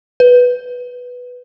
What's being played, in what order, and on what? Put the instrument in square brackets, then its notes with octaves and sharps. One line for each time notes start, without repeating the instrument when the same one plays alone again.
[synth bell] B4